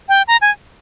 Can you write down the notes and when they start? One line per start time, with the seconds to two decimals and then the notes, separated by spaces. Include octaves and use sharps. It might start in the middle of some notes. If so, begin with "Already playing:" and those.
0.09 G5
0.28 A#5
0.42 G#5